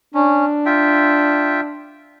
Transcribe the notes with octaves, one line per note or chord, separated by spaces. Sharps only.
C#4 D4
F4 E5 G5